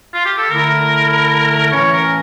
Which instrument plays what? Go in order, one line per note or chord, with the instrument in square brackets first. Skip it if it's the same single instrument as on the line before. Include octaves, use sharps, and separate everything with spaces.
[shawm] F4
G4
A4
[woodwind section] D3 A3 E4 [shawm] A#4
[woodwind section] A2 E3 A3 C#4 [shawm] C#5
[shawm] A#4